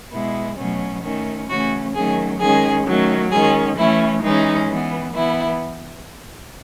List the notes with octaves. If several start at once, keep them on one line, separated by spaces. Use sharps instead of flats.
B2 G#3 B3 E4
B2 F#3 A3 C#4
D#3 A3 C#4
C#3 E3 A3 C#4 F#4
D#3 F#3 A3 C#4 G#4
D#3 G#3 C#4 G#4
D#3 F#3 A3 C#4
D#3 G#3 C#4 G#4
E3 A3 C#4 E4
E3 G#3 C#4 D#4
E3 B3
E3 B3 E4